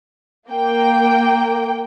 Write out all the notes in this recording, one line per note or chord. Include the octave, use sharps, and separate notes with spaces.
A#3 G5